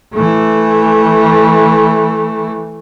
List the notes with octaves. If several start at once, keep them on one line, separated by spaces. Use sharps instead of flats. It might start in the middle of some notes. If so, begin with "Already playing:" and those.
E3 A3